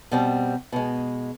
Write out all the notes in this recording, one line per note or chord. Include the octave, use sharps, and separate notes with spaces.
B2 G3 C4
B2 G#3